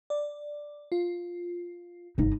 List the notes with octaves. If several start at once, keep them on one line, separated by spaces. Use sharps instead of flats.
D5
F4
G1 D#4